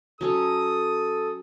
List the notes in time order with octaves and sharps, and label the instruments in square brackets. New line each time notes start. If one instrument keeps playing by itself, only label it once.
[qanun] F#3 C#4 [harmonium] A4 [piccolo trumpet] D#6